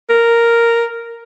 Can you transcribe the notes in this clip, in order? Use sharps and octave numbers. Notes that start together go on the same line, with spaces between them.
A#4